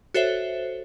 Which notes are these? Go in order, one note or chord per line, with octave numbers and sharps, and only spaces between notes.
F#4 A4 C5 C#5 E5